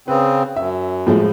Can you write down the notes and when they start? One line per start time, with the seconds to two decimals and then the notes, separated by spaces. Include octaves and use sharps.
0.08 C#3 C4 B4
0.56 F#2 E5
1.07 A2 F3 G#3